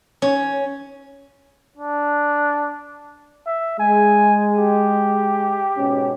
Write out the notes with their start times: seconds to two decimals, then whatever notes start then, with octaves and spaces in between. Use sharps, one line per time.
0.22 C#4
1.77 D4
3.46 E5
3.79 G#3 G#5
4.58 G4
5.77 G#2 B2 C#4